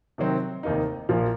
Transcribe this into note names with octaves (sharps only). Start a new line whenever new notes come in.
C3 D#3 F#3 C4 F#4
F1 D#2 D#3 A#3 D#4
A#1 A#2 F3 A#3 F4